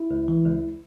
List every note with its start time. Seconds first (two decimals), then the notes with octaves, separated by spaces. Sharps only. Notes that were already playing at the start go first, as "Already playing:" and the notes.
Already playing: E4
0.11 C#2
0.28 E3
0.45 C#2